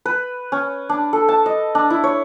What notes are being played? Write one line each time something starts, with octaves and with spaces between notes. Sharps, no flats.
B4
C#4
D4
A4
A5
D#5
D4
E4
C#5